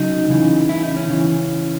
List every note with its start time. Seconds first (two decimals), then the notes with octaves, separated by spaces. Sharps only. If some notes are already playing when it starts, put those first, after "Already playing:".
Already playing: C#3 F#3 D#4
0.30 C#3 E3
0.69 E4
0.83 D#4
0.96 C#4
1.10 C#3 E3